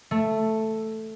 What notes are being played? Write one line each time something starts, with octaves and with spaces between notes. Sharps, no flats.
A3